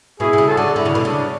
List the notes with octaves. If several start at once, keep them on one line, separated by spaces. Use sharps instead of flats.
B2 E4 G#4
B2
C#3
F#4 A4
D3
D3 E4
C#3
B2
C#3 D4